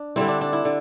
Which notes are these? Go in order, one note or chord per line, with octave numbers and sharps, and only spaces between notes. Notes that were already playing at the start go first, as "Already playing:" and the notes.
Already playing: D4
D3 G3 C4 E4
D4
D4
E4
D3